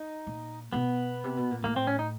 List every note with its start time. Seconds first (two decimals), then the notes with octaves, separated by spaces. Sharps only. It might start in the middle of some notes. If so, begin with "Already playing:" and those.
Already playing: D#4
0.27 A#2
0.73 B2 B3
1.24 C3
1.37 B2
1.51 A#2
1.64 A2 A#3
1.76 C4
1.87 C#4
1.99 D#4